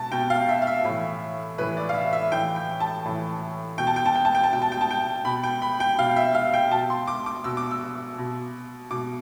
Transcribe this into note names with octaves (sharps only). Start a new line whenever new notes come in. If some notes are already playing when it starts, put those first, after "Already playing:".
Already playing: B2 A5
B2 G5
F5
E5
F5
E5
A2 E3
A2 E3 B4
D5
F5
E5
E5
A2 E3 G5
G5
A5
A2 E3
B2 G5
A5
G5
A5
G5
A5
G5
A5
B2 G5
A5
G5
A5
G5
B2 B5
G5
B5
G5
B2 F5
E5
F5
G5
B2 A5
C6
D6
D6
B2 E6
D6
E6
B2
B2 D6